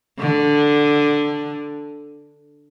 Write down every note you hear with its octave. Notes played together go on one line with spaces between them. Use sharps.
D3